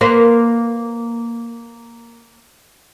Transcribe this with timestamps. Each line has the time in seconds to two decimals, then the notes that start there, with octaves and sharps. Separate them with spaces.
0.01 A#3 B4 C5